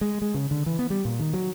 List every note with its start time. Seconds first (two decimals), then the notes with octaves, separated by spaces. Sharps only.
0.01 G#3
0.22 G#3
0.34 C#3
0.51 D3
0.66 E3
0.79 B3
0.90 G3
1.05 A#2
1.20 D#3
1.34 F#3